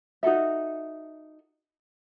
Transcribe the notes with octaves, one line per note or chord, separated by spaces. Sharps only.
D#4 F#4 A4 E5